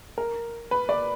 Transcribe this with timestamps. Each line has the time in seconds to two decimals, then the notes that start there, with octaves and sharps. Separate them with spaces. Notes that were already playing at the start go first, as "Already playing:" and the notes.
0.18 A#4
0.71 B4
0.89 D5